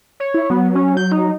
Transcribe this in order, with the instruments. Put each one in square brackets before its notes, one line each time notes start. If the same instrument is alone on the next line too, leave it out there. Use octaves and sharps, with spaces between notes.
[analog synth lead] C#5
[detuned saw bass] E4
[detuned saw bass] F#3 [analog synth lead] B3
[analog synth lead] C#4
G6
D#4